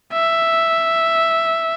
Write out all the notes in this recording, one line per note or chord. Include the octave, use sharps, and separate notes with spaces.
E5